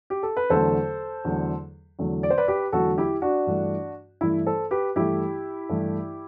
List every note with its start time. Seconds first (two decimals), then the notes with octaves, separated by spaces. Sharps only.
0.10 G4
0.23 A4
0.37 B4
0.50 E2 D3 F#3 A3 A4 C5
1.25 E2 D3 F#3 A3
1.99 E2 D3 F#3 A3
2.23 D5
2.30 C5
2.38 B4 D5
2.48 G4 B4
2.72 E2 D3 F#3 A3 F#4 A4
2.98 E4 G4
3.22 D4 F#4
3.47 G2 E3 A3
4.21 G2 E3 A3 E4
4.46 A4 C5
4.71 G4 B4
4.96 G2 E3 A3 E4 G4
5.69 G2 E3 A3